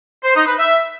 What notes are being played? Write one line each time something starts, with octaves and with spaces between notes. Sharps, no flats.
C5
D#4
B4
E5